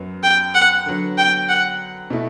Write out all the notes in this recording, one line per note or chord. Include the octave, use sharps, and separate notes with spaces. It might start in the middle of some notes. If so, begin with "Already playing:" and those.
Already playing: F#2 F#3 B3
G5
F#5
D3 F#3 B3
G5
F#5
B2 A3 E4